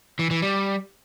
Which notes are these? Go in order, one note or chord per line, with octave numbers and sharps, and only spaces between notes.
E3
E3
G3